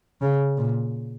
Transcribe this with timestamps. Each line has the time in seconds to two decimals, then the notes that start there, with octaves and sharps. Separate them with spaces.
0.21 C#3
0.58 A#2